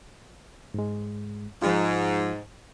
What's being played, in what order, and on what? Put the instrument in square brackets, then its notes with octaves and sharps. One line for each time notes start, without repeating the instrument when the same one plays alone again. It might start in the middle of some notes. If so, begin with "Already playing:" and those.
[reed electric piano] G#2 G#3
[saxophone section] G#2 [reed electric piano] F3 F4